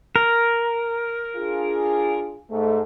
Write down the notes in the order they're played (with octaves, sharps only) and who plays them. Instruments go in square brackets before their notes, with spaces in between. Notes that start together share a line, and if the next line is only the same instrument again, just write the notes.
[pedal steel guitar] A#4
[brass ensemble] D4 F4 G#4
G#2 A3